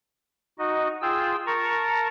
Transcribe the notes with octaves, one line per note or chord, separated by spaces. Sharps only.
D#4 F#4 D#5
F4 G#4 G5 E6
A#4 A5 A#5 C#6